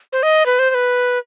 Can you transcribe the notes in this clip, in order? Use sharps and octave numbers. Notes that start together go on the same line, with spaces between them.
C5
D#5
B4
C5
C5
B4